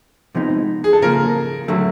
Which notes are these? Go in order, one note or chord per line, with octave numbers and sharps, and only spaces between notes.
C3 F3 G#3 B3 D#4
G#4
A4
C#3 F3 A#3 A#4
D3 F#3 A3